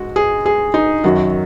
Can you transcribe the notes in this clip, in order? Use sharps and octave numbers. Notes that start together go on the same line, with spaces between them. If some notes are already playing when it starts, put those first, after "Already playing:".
Already playing: G#2 G#3 F#4
G#4
G#4
D#4
F#2 D#3 F#3 F#4